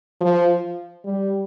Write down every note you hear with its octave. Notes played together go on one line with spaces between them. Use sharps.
F3
G3